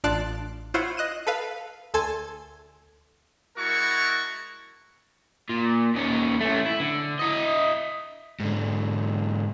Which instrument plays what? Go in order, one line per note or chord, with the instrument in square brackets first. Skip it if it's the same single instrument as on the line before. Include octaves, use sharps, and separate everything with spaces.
[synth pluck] A1 D4 F4 D5 A5 F#6
E4 F4 C5 C#5 F5 F#5
D#5 F#6 D#7 E7
A4 B4 F5
D2 A4 G#5 C6 G#6
[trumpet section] G#3 E4 F#4 A#4 A5 C#6
[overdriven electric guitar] A#2
D#2 C#4
A3 C#4
E4
D3
E4 D#5
G#2 D3